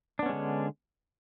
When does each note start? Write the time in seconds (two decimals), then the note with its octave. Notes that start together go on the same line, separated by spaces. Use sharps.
0.19 D4
0.23 B3
0.26 C#4
0.29 G#3
0.33 D3